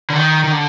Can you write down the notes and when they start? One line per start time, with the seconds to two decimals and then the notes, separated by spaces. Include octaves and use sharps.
0.10 D3
0.16 D#3
0.44 D#3
0.52 D3